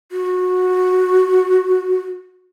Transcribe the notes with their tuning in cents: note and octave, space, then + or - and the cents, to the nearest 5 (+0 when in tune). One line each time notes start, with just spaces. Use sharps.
F#4 -15